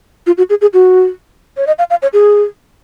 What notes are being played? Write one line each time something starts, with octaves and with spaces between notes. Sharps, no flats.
F4
F#4
G#4
G#4
F#4
C#5
D#5
F5
F5
C#5
G#4